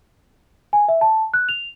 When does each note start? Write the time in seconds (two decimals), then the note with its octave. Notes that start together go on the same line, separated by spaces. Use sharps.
0.73 G#5
0.88 E5
1.01 A5
1.34 F#6
1.49 F7